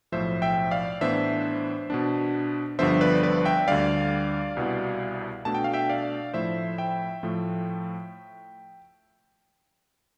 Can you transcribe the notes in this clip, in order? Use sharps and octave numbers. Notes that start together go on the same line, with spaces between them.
B1 A2 F3 C5 E5
E5 G5
D5 F5
A2 E3 B3 D4 C5 E5
B2 B3 D4
G1 G2 D3 F3 B3 C5 E5
B4 D5
B4 D5
E5 G5
D2 D3 G3 D5 F5
C2 B2 B3 E4
B2 A3 D4 A5
G5
F5
E5 G5
D5 F5
A2 F3 A3 E4 C5 E5
E5 G5
A2 F3 A3